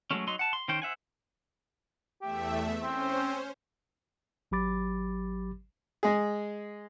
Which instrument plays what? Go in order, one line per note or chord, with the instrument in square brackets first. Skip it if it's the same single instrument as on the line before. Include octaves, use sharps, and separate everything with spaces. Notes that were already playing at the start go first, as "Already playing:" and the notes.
[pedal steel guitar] F#3 G#3 A3 C#4
F#3 D#4 C6
F#5 A5
C6
D#3 C#4 C5 G5
C5 E5 F#5 G#5
[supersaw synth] E2 A3 E5 [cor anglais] G4
[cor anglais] C4 [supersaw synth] C#4 C5
[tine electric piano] G#1 F#3 G4 B5 D6 A6
[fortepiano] G#3 G#4